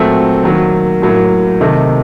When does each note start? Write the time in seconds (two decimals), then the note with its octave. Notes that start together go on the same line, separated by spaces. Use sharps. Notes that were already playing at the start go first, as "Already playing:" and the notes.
Already playing: A#2 F#3 A3 C4
0.43 D#3 F#3 A#3
1.02 A2 F#3 A#3
1.61 C3 D#3 A3 D#4